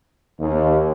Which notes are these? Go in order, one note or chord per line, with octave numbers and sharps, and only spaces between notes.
D#2